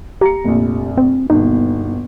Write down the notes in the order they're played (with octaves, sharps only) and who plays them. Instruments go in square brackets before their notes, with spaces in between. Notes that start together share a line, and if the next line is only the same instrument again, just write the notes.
[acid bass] G4 [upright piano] A#5 C#7
[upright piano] F1 A#1
[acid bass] C4
[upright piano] G1 D#2 B2 [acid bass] D#4